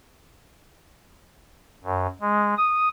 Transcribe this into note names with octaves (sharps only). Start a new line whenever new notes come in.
F#2
G#3
D#6